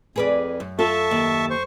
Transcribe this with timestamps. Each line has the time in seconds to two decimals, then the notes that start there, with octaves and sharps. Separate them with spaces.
0.16 F2 G#4 B4 D5
0.60 F#2
0.79 F4 A4 E5 A5 C#6
1.11 D#2
1.50 C5 C#6